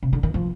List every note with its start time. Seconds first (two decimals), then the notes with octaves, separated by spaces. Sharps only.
0.03 C3
0.13 D3
0.23 D#3
0.34 F3